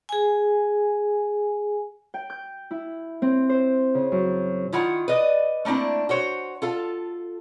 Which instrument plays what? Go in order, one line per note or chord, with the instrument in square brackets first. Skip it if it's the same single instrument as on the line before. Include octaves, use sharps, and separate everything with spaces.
[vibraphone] G#4 G#5
[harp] G5
G6
E4
C4
C5
C#3
F#2
[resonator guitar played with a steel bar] D#3 E4 F4 F#5
B4 D5 D#5
A3 A#3 C4 D4 E4
F#4 C5 C#5
F4 A4 F5